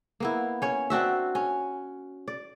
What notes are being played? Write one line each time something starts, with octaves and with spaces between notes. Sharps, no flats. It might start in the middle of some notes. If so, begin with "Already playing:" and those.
A#3 B3 E4
C#4 C#5
C4 D4 F#4 E5
C#4
D5